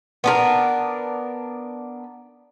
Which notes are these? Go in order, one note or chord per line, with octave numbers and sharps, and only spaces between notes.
B3 D4 A#4